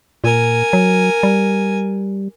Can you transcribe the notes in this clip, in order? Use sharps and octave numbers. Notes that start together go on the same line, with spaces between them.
A#2 A#4 G#5
F#3
G3